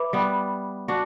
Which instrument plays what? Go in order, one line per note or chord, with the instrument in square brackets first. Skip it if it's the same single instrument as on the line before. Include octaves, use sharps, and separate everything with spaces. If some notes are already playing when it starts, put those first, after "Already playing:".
Already playing: [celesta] B4 E5 B5 D6
[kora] G3 B3
D4 F#4